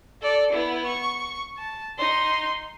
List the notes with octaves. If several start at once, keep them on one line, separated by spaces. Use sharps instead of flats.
A4 D5
B3 E4
C#6
A5
D#4 C6